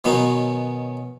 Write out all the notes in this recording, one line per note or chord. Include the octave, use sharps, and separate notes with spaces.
B2 D#3 F#3 B3 C#4 D#4